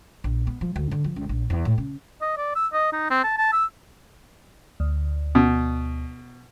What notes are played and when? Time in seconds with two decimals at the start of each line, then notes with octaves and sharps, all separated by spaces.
0.24 A#1
0.47 B3
0.61 F3
0.76 D2
0.91 D3
1.04 F3
1.16 C#2
1.29 A#1
1.50 E2
1.65 A2
1.78 C#3
2.21 D#5
2.37 D5
2.55 E6
2.73 D#5
2.92 D#4
3.10 C4
3.24 A5
3.38 A5
3.52 E6
4.80 D2
5.35 B2